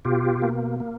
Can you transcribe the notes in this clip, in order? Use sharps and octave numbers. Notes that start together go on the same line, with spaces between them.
B2 F4 G4
A#3
A#3